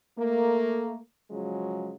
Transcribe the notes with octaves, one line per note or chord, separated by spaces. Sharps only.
A3 A#3
C#3 F3 F#3 G#3